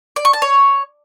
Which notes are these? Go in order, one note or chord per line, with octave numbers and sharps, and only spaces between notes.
D5
C#6
A5
C#5